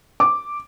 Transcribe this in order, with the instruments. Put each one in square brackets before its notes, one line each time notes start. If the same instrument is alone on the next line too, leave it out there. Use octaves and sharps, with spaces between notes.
[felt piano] D6